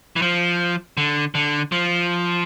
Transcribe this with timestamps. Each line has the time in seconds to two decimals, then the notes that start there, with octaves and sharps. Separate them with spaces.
0.16 E3
0.22 F3
0.97 D3
1.35 D3
1.72 F3